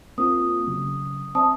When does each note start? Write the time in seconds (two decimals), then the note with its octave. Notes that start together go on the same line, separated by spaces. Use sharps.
0.18 A#3 C4 F4 D#6
0.67 C#3 F#3
1.35 C4 D5 E5 A5 D#6